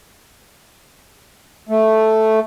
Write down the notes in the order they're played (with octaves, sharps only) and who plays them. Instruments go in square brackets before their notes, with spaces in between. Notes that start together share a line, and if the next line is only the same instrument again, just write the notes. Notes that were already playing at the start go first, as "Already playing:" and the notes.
[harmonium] A3